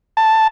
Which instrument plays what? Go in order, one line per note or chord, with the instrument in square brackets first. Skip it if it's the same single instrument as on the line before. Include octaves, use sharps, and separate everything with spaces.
[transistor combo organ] A5